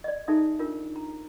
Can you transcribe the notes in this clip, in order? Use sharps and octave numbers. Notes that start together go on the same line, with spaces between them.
D5 D#5
D#4 G#4 A4 E5 G#5 D#6
D4 F4 A#4
A#5